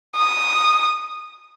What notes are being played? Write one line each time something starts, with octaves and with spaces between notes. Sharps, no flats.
D#6